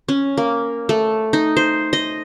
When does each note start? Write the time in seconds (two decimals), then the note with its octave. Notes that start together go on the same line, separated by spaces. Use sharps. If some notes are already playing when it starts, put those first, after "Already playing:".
0.08 C#4
0.37 A#3
0.89 A3
1.33 D#4
1.57 C5
1.93 D#5